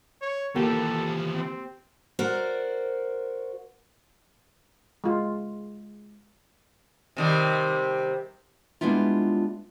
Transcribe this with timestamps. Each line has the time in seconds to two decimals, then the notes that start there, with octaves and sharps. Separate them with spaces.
0.22 C#5
0.56 E3 F3 A#3 G4 A4
1.34 C4
2.19 F#4 A#4 C5 D5
5.04 G#3 F4
7.17 C3 D#3 G3
8.81 G3 G#3 B3 D4 E4 F4